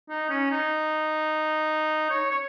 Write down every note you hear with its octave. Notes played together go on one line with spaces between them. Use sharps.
D#4
C#4
D#4
C#5
C#5